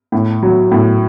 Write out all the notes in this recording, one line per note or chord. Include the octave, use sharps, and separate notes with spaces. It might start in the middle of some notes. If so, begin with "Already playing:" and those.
A2
F#3
A2